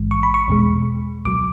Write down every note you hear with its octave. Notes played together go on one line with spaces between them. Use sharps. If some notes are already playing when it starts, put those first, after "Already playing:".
Already playing: A1 G#2 E3 G#3
C#6
B5
C#6
E2 B2 G#3
C#2 B2 F#3 D6